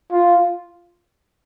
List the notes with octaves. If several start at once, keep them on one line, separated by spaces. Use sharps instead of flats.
F4